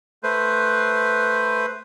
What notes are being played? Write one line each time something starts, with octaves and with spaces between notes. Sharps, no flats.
A3 B4 C5